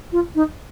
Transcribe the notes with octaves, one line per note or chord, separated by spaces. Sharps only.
F4
D#4